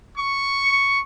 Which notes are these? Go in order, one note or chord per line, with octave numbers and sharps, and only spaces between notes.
C#6